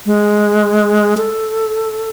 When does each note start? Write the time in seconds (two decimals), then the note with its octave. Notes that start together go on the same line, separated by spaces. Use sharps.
0.06 G#3
1.18 A4